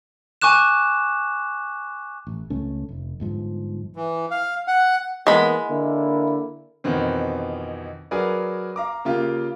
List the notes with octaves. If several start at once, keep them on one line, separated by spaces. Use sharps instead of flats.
G#5 C#6 D6 F#6 E7
A1
C#2 A3 C#4
F1
G1 G#2 F3
E3
F5
F#5
E3 G#3 A#3 B3 B5
D3 A#3 E4
F2 B2 D#3 E3 C4
F#3 G#4 A#4 B4 D5
F5 A#5 D6
C#3 A#3 F4 G4